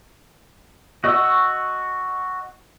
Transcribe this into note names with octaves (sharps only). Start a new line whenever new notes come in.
F#4 D#5 F#5 C#6 E6